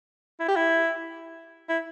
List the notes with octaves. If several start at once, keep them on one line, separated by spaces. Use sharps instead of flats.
E4
G4
E4
E4